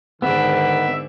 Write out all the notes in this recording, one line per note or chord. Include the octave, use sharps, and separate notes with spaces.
G#2 D3 D#3 B3 E5